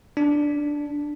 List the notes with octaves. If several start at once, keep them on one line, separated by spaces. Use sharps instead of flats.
D4